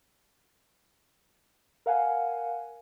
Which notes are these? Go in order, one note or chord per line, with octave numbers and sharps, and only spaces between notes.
A#4 F5 F#5 G#5